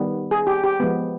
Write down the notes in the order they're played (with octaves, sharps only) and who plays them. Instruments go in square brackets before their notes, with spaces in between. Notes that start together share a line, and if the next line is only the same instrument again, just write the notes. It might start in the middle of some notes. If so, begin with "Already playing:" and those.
Already playing: [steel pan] D#3 G3 B3
G#4
G4
G4
F3 G#3 B3